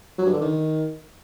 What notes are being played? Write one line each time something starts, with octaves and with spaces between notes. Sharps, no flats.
F#3
G2
D3
D#3